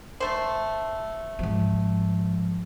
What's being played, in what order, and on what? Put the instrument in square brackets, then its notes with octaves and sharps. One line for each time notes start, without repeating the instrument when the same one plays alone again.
[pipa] A3 C5
[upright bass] G#2 F3